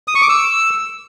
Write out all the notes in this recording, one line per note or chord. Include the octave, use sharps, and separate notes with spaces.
D#6
C#6
D6
E6